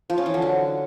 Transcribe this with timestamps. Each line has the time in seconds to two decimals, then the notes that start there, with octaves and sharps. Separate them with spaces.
0.10 F3
0.18 C#4
0.26 E3
0.34 D3
0.42 F#3